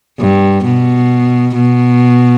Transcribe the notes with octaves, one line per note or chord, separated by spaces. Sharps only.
G2
B2
B2